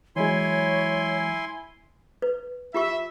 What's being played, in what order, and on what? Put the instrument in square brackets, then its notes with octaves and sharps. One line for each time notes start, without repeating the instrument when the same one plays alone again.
[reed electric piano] E3 F#3 G#3 [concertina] E4 G#5 C6 [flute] C#5
[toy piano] B4
[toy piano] F4 G4 C#6 [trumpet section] E5